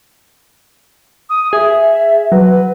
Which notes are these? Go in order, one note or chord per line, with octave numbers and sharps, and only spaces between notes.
D#6
G#4 E5
F#3 B4